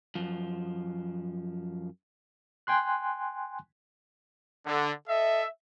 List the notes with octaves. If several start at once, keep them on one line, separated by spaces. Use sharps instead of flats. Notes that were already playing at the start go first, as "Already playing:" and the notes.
F#2 F3
G5 G#5 C6 F#6
D3
A4 D#5 E5